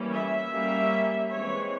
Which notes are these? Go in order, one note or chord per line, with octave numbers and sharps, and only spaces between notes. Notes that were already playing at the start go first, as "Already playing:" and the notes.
Already playing: E3 G3 A#3 C#4
E5
G3 A#3 C#4
E3 G#3 C4 C#5